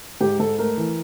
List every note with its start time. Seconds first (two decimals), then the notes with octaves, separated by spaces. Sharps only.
0.21 G#2 G4
0.40 G#2 A4
0.58 A3 A#4
0.77 E3